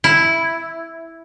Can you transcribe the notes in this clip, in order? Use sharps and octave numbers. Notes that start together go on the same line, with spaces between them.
E4